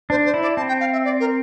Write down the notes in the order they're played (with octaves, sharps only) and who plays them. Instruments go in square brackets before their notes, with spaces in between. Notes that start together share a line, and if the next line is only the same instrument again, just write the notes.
[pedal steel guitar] D4 [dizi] C5
[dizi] C5
[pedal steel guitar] E4
[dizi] D5
[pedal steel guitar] C4 [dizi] A5
[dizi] G5
F5
E5
D5
A#4